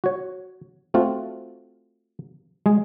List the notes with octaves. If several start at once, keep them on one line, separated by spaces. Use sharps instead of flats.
F#4 C#5
A3 C4 F4 F#4
G#3 G#4